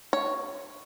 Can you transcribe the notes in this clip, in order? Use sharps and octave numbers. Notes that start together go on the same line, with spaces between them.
C#5